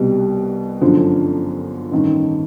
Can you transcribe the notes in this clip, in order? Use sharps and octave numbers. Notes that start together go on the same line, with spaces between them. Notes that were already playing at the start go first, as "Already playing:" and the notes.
Already playing: C2 B2 G3
G1 F#2 D3 F3
A1 G2 D#3